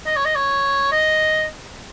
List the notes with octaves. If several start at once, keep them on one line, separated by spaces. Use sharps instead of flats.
D#5
C#5
D#5
C#5
D#5